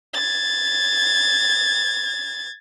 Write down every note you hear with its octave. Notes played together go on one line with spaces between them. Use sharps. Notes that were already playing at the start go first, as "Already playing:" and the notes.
G#6 A6